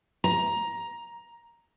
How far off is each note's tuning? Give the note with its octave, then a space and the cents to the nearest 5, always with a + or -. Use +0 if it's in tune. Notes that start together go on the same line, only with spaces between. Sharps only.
A#5 +10